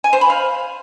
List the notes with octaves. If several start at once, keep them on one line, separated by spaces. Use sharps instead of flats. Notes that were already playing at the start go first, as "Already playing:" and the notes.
G#5
C5
B5
F5